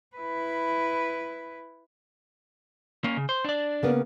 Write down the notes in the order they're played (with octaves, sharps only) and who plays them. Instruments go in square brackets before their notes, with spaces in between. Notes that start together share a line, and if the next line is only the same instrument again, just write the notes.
[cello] E4 B4
[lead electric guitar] A#3 C#4
C#3
C5
D4 D5
[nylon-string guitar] C#3 A#3 B3